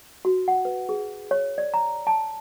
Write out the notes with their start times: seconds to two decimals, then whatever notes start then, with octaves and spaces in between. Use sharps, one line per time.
0.25 F#4
0.48 F#5
0.65 B4
0.89 G#4
1.31 C#5
1.58 D5
1.74 A#5
2.07 A5